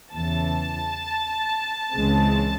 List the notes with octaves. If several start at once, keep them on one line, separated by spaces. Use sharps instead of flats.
E2 C#3 E3 A5
C#2 C#3 E3 G#3 C4